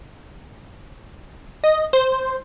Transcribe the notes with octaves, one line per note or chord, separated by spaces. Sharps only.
D#5
C5